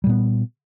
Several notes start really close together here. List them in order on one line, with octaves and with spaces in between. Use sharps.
G3 A#2 B3